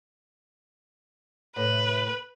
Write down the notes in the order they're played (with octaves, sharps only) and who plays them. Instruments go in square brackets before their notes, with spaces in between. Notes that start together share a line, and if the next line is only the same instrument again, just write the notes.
[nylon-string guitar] A2 C3 [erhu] B4